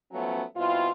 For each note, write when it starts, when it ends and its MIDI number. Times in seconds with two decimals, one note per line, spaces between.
0.12 0.42 53
0.12 0.42 54
0.12 0.42 57
0.12 0.42 59
0.12 0.42 61
0.55 0.89 47
0.55 0.89 55
0.55 0.89 60
0.55 0.89 64
0.55 0.89 65